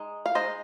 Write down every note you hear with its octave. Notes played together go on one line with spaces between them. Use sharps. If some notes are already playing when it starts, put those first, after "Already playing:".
Already playing: G#3 D#4
F5
G#3 D#4 C5 D#5